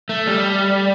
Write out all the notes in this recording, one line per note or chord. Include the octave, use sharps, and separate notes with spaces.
A3
G3